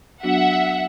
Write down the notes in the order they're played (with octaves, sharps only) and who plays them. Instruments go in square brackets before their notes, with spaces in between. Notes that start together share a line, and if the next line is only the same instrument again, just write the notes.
[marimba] F#3 B3 D4 F#4 [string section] E5 F#5